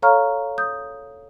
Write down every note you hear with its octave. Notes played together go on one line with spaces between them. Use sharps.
A4 C#5 F5 A#5 C#6 F6
D#6 G6